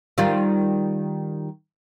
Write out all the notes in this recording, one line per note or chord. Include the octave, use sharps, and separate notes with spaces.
D#3 G3 F4